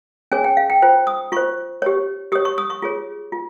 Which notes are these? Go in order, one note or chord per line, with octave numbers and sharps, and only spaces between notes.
C#4 G#4 C#5 G#5
G5
F5
G5
F4 C5 G5
D#6
F4 C5 C#6
G4 C#5
G4 C#5 D#6
C#6
D#6
C#6
F4 G#4 C#5
F4